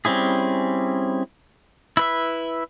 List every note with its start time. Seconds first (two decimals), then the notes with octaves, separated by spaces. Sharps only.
0.05 G3 C4 C#4 E4 G#4
1.97 E4 B4 E5